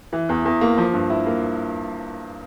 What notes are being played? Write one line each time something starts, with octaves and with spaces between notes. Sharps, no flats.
E3
E2
E2
A#3
F3
G2
E4
A#3